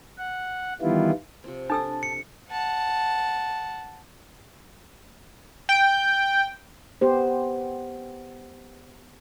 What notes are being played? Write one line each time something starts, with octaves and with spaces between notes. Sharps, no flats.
F#5
D#3 E3 G3 B3 E4 F4
C3 F3 C4
D4 A4 A5 E6
C#7
F#5 A5
G5
B3 G4 C5